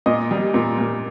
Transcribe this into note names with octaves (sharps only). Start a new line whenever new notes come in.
A#2 D#5
G3
A#2
A#2